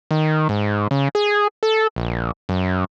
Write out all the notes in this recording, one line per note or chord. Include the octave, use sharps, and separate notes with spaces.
D#3
G#2
C#3
G#4
A4
A#1
F#2